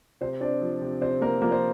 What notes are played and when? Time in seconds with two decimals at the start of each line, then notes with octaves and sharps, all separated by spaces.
0.21 C3 C4 C5
0.41 C4 D4 D5
0.61 F3
0.82 C3
1.01 C3 C4 C5
1.21 A#3 C4 A#4
1.42 F3 A#3 A#4
1.51 C4 C5